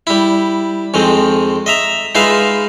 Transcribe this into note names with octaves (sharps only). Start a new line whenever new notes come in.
G3 E4
F2 D#3 G#3 C4
D#5 E5 A#5
G#3 D#4 F4 B4 E5 F5